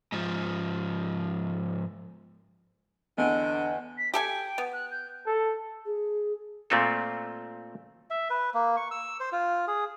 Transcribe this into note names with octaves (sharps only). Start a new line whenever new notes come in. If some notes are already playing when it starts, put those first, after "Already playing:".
G#2 F3
E2 D3 D#5
B6
G4 A4 G5 G#5
B3
F#6
G6
A4
G#4
A#2 A3 C4 F4 A4
E5
B4
A#3
C#6
E6
C5
F4
G#4